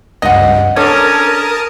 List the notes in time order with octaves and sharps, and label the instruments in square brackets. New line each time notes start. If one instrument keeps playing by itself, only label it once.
[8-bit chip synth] C#2 G2 [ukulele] D#5 F#5
[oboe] C#4 [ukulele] D4 A4 C#5 [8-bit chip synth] A#4 A5 D#6